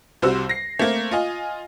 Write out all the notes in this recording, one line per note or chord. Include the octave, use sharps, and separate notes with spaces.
C2 G3 C4 F#4 C5 E6
A#6 C7
A3 A#3 C4
F4 D#5 G#5